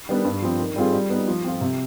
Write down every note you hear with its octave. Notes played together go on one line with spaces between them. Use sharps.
D#3 G3 B3 D4
G2
F3 C4
D#3
G3 C4 F4 G#4
G3
B3 D#4
F3
C4 F4
C3